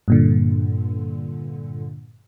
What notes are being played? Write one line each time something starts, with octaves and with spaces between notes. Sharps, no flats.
G2 A#2 D3